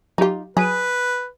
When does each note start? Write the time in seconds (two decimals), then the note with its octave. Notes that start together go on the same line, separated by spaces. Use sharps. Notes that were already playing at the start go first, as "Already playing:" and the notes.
0.18 F#3 D#4 F4 G4
0.57 F#3 G#4 B4 B5 D#7